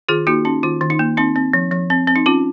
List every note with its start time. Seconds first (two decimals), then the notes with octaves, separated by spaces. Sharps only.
0.09 D#3 F4 G#4
0.27 A#3 D#4 F#4
0.45 C#4 D#4
0.63 D#3 F4
0.81 D#3
0.90 D#4
0.99 A#3
1.17 C4 D#4
1.36 C4
1.53 F3
1.71 F3
1.90 C4
2.08 C4
2.16 D#4
2.26 C#4 F4